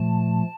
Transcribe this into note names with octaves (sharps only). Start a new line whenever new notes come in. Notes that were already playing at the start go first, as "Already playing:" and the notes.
Already playing: A#2 F3 A3 A5